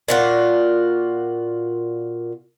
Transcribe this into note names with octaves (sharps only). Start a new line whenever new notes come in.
A#2 F4 F#4